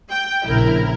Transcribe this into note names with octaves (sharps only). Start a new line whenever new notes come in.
G5
A#1 C#3 E4 A#4